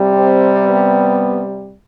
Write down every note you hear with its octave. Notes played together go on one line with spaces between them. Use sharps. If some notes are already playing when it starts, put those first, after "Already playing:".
Already playing: C3 G3
C4
B3